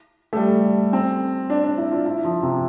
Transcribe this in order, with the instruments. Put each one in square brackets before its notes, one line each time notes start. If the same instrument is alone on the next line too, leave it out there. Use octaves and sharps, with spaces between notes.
[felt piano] A3
G3
C4
D4
D4
E4
F4
E4
F3
C3